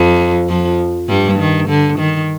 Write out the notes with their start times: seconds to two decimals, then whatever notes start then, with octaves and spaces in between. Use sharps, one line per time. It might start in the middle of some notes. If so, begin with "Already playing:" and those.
Already playing: F2 F3
0.49 F2 F3
1.09 G2 G3
1.39 D#3
1.69 D3
1.99 D#3